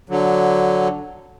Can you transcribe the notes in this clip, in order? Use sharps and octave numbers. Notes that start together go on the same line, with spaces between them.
D3 F#3